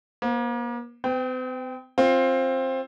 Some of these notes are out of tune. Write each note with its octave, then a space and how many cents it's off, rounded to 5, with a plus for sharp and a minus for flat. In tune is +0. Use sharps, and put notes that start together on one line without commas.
A#3 +40 C5 +0
C4 -45 G5 +0
C4 +15 F4 +10